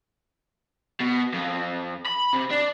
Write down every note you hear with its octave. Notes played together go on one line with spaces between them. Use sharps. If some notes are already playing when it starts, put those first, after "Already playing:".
B2
F2
B5
C3
D4